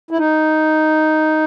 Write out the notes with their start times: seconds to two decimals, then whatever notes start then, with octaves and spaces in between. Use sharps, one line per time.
0.11 E4
0.18 D#4